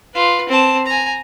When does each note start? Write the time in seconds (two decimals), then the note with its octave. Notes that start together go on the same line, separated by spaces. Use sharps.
0.14 F4 B4
0.49 C4 A5
0.86 G#5 A#5